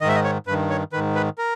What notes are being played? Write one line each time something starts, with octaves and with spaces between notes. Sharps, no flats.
G#2 D#3 D#5 E5
D#5
C#5
G2 D#3 B4
C#5
G#2 D#3 B4
B4
A#4